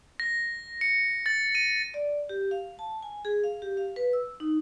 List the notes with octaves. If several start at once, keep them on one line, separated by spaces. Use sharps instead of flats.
A#6
C#7
A6
D#7
D5
G4
F5
A5
G#5
G#4
F5
G4
F5
B4
E6
D#4